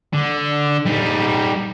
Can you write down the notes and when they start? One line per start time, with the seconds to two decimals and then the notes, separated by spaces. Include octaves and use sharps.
0.13 D3
0.86 G3 D#4